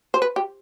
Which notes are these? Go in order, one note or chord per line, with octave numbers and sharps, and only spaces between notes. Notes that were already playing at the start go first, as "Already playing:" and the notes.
C5
B4
G4